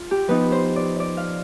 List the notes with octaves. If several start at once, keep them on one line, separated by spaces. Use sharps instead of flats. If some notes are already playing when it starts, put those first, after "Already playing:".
Already playing: F4
G4
F3 B3 D#4 B4
C5
D5
D5
F5